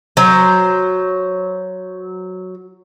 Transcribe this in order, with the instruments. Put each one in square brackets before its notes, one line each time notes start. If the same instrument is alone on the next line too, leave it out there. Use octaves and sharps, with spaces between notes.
[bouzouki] F#3 C5